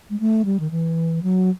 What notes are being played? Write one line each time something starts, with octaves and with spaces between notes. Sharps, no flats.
G#3
A3
G3
D#3
E3
F#3